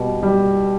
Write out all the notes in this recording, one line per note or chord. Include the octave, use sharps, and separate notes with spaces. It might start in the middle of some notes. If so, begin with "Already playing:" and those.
Already playing: B2 G3
G3